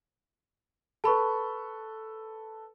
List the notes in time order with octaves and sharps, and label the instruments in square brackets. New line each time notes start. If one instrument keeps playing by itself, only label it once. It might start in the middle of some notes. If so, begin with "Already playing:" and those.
[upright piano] A4 B4 [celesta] A5 B5 C#6